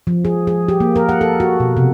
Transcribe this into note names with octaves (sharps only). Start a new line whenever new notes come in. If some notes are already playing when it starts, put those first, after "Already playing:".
F3
G#4
G#4
G4
A#3
A#4
F#5
A4
F#4
B2
C3